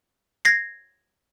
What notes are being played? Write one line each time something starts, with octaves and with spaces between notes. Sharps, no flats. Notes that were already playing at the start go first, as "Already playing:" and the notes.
G#6 A#6 C7